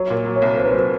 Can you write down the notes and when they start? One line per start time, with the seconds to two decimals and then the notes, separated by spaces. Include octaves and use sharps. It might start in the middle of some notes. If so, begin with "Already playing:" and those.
Already playing: F#3 C#5
0.10 A#2
0.25 F#3
0.36 C#5
0.42 C2
0.57 C2 C5
0.65 B4
0.72 F#3 C5